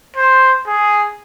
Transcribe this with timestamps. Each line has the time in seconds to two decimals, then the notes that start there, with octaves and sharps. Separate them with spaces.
0.16 C5
0.67 G#4